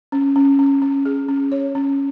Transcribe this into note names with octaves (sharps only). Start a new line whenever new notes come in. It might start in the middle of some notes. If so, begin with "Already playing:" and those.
C#4
C#4
C#4
C#4
G#4
C#4
C#5
C#4